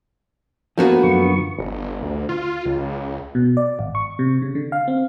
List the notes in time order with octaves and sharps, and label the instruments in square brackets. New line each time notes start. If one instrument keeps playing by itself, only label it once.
[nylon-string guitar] D2 D4 F#4 [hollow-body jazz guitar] F3 A#3 B3
[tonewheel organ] F#2 D3 C#6
[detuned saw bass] G1
D2
F4
C#2
[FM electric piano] B2
D5
G#1
C#6
C3
C#3
D3
F5
C4